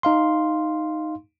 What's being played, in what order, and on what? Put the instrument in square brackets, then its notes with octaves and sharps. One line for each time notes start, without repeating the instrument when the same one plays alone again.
[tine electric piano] D#4 F5 C6